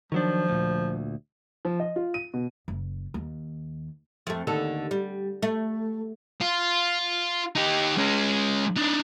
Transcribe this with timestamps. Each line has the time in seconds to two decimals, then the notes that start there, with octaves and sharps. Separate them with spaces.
0.12 D#3 F3 F#3 D4
0.48 D2 A#2
1.65 F3
1.80 D#5
1.96 F4
2.14 D#7
2.34 B2
2.68 F#1
3.14 D#2
4.27 F2 A3
4.47 D#2 D3 A4
4.91 G3
5.42 A3
6.41 F4
7.55 D#4 G4
7.97 G#3 C#4
8.76 D4 D#4